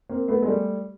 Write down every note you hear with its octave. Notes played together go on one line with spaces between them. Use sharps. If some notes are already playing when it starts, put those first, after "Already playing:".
A#3 C4
A3 B3
G#3
G3 A3